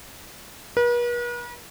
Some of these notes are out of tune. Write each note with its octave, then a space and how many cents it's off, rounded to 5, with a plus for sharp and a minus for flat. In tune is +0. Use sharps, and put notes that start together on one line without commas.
B4 -45